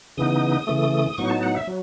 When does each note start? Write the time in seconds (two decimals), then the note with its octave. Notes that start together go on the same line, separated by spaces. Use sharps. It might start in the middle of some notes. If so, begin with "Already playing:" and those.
0.17 C#3 E3 B3 D#4 D#6
0.67 C#3 E3 A3
1.18 A2 F#3 B3 D#4 C#6
1.30 A5
1.43 F#5
1.55 E5
1.67 F#3